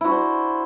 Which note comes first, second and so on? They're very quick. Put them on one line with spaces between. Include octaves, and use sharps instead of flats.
E4 F#4 D4 C5